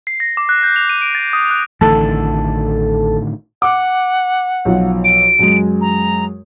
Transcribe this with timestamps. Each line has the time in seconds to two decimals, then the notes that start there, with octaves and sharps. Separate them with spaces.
0.07 C7
0.20 A#6
0.37 D6
0.49 F#6
0.63 G6
0.76 F7
0.89 D#7
1.02 D7
1.15 A6
1.33 D#6
1.51 F#6
1.81 A1 A2 D3 D#3 A4 A5
3.62 F#5 D6
4.65 B1 F3
5.05 D7
5.39 F#2 G#3
5.81 A#5